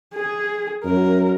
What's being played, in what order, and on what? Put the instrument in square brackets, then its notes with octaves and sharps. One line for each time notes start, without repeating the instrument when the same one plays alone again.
[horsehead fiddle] G#4
[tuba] F#2 [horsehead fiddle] A#4